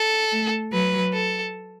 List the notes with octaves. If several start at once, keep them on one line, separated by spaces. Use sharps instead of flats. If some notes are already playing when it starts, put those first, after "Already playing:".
Already playing: A4
A3
F#3 B4
A4